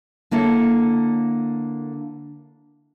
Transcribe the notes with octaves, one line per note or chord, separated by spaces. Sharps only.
D3 A#3 E4 A4 C#5